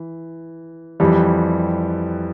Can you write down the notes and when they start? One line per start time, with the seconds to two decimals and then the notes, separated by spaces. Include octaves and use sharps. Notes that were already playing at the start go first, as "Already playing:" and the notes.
Already playing: E3
1.00 F2 E3 G3